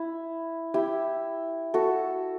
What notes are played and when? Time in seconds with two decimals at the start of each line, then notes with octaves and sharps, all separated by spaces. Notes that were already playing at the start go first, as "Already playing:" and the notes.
Already playing: E4
0.74 E4 G4
1.74 F#4 A4